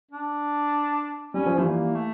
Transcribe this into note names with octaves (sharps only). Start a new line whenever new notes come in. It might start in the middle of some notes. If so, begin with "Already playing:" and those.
D4
G3 C#4
F3
E3 G3 A3
A#3
A3